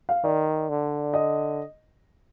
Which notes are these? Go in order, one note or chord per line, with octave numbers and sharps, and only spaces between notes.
F5
D#3 D5
D3
D#5